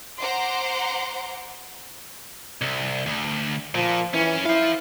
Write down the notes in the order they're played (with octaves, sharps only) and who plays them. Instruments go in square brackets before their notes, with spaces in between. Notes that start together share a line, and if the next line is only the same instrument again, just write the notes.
[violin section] C5 F#5 A#5 C6 D6
[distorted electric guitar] C2
D2
[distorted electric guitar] A#2 [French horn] F3
[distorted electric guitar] F#2 C#4 [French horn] E3
[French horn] E4 [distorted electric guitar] C5 F5